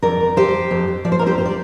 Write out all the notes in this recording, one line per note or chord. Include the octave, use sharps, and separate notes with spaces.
F2 A#4 D5
F2
F2 G4 C5
F3
F2
F2
F3 D5
C5
F2 A#4
G4 C5
C5
D5